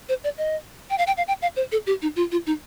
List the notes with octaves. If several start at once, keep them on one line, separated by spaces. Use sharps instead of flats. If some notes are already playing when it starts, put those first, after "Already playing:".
C5
D5
D#5
G5
F5
G5
F5
G5
F5
C5
A4
G4
D#4
F4
F4
D#4